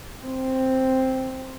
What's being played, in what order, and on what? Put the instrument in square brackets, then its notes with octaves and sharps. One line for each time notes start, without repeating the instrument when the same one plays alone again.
[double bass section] C4